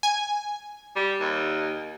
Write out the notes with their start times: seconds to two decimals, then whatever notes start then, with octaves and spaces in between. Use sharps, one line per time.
0.03 G#5
0.96 G3
1.21 D#2